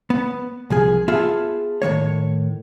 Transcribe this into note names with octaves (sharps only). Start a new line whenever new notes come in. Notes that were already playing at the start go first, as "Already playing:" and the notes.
B3
C2 F3 G#4
B3 F4 G#4 A4 E5
A2 D#3 A#3 C#5